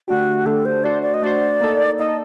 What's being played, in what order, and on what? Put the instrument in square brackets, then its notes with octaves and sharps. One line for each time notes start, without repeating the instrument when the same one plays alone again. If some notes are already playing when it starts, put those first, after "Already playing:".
[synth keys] D3 A3 D4 G4 [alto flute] F#4
[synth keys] D3 A3 D4 G4 [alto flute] A4
[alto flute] C5
[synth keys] A3 D4 F#4 C5 [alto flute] D5
[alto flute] D5
D#5
[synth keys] A3 D4 F#4 C5 [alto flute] D5
[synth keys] A#3 D#4 A4
[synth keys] A#3 D#4 A4 [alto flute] D#5